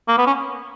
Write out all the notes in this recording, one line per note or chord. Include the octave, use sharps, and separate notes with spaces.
A#3
B3
C#4